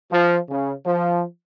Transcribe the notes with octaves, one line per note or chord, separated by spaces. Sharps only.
F3
C#3
F3